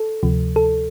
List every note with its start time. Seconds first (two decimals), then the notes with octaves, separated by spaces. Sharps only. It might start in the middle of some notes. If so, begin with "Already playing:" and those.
Already playing: A4
0.23 D2 C3 F3
0.56 A4